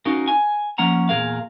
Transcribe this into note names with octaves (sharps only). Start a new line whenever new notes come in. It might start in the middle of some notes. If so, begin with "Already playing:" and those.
C#4 D#4 F4 F#4 A#4
G#5
F3 A#3 C#4 F#5 A#5
E2 A#2 G#4 A#4 F5